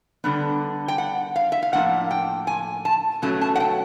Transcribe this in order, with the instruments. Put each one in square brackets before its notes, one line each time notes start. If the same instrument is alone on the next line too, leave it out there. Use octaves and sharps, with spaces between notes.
[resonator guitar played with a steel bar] D3 G3 B3 D4
G5
F#5
F5
E5
F5
A2 F3 A#3 D4 F#5
G5
G#5
A5
B2 F#3 A3 C#4 A5
A5
F#5
G5